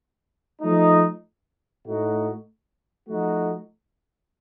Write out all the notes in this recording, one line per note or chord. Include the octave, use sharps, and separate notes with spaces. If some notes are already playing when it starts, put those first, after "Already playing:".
F3 A3 D#4
A2 A3 D#4 F#4
F3 A3 D#4 F#4